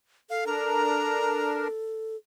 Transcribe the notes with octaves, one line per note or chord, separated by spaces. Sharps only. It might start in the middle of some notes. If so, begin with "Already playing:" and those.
A4 F5
D4 A#4 A#5